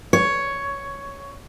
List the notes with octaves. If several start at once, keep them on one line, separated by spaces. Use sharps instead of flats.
C#5